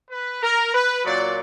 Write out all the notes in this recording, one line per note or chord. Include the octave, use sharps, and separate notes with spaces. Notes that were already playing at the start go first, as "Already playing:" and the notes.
B4
A#4
B4
A#2 F#3 D5